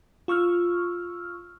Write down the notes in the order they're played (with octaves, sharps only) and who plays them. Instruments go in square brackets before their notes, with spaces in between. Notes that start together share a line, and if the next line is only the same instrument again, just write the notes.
[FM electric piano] F4 C#6 E6 F6